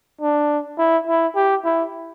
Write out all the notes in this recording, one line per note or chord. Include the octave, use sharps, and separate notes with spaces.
D4
E4
E4
G4
E4